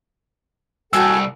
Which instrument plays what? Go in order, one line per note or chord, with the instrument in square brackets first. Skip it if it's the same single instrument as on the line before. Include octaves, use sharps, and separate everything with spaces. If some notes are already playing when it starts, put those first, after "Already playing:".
[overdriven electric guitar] C2 [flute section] F#4 A4 G5 [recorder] G#5 [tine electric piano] E6